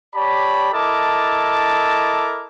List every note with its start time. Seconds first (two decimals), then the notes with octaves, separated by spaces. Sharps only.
0.15 G4 C#5 D5 A5 B5
0.72 E4 A4 A#4 D#5 A5 D6